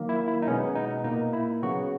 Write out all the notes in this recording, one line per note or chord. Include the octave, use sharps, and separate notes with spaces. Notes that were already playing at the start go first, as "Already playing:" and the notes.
Already playing: D#3 F#3 A#3
E4
E4
D#4
B2 G#3 B3 C#4
D#4
A#2 A#3 D#4
E4
C#3 F#3 B3 F#4